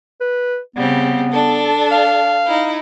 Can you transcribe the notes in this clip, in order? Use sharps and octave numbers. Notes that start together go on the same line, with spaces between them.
B4
C#3 G3 B3 C4
D4 A4
F5
D#4 E4